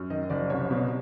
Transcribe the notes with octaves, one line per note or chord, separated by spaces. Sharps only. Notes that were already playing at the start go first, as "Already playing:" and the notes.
Already playing: F#2
D#3 D#5
F#1 D5
C2 C#5
B2